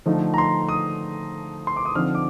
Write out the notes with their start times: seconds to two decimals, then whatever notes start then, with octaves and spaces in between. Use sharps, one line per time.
0.06 D3 F3 A3 D#4
0.34 A#5
0.38 C6
0.69 D#6
1.67 C6
1.76 D6
1.85 D#6
1.95 D3 F3 C4 D#4 F6
2.15 D6